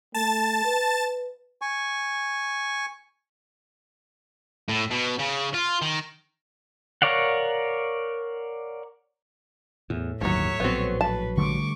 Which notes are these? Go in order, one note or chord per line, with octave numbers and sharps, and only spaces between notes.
A3 A5 A6
B4
G#5 C#6
A2
B2
C#3
F4
D#3
A#4 C#5 D5 F5 F#5
E2 A2
G1 D#2 F3 F#3 C#5 E5
A#1 F#3 B3 C4
B4 A5
D3 G3 A3 C#6 D6